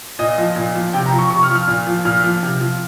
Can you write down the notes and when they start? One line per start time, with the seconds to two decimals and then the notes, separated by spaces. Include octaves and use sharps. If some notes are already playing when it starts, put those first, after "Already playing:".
0.19 A#2 D#5
0.38 F3
0.56 A#2
0.75 F3
0.93 C3 G5
1.06 A#5
1.12 F3
1.19 C#6
1.30 C3 C#6
1.43 F6
1.50 F3
1.55 F6
1.68 A#2
1.87 F3
2.05 A#2 F6
2.24 F3
2.43 C3
2.60 F3